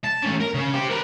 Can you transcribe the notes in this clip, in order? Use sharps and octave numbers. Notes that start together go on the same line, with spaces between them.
A5
A3 C#4
A#4
C#3
G4 C5
A#4 B4